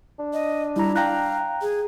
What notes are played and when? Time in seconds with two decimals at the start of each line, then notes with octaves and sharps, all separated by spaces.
0.19 D4
0.33 D#5
0.76 G3 E4 A#5
0.96 F5 G5 A#5 F#6
1.62 G#4